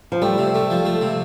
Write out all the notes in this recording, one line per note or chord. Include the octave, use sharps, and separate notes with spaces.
F3
G3 A3
C3
A3
F3
A3
C3